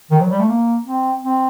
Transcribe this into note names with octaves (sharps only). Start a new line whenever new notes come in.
D#3
F#3
G3
A3
A#3
C4
C4